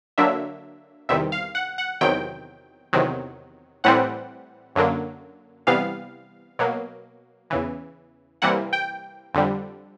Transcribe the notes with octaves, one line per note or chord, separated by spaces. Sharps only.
D3 F#3 A#3 D4 E5
E2 C3 D#3 G3 E5
F5
F#5
F#5
E2 C3 D#3 F#3 G5
E2 C3 D#3 F#3
A2 E3 G3 C4 F#5
F#2 D3 F#3 A#3
C3 E3 G3 B3 F5
B2 F#3 A#3
E2 C#3 E3
C3 E3 G3 A#3 F#5
G5
F2 D3 G3